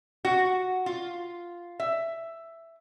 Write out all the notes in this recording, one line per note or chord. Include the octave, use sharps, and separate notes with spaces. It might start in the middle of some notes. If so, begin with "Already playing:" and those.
F#4
F4
E5